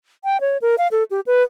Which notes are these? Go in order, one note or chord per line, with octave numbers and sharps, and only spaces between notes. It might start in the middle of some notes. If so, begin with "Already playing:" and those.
G5
C#5
A#4
F5
A4
G4
B4